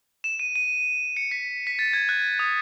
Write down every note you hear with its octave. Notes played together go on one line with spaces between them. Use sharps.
E7
D#7
D#7
C#7
B6
B6
A6
G#6
F#6
D#6